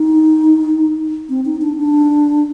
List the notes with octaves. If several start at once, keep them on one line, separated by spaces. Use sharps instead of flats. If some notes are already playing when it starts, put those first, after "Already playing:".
Already playing: D#4
C4
D#4
D4
D4